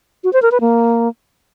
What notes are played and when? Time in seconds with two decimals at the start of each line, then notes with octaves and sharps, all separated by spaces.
0.24 F#4
0.33 C5
0.42 A#4
0.52 B4
0.61 A#3